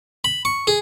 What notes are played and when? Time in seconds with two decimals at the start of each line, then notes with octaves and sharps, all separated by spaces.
0.24 B5
0.45 C#6
0.67 G#4